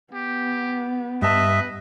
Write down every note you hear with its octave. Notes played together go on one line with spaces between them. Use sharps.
B3 G4
G2 B4 D#5 E5 A5